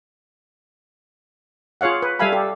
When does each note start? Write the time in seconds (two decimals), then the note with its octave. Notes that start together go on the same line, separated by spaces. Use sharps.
1.81 F4 G#4 C#5 F5 F#5
2.02 B4
2.19 G3 A4 E5 F5 G#5 B5
2.32 G4 A4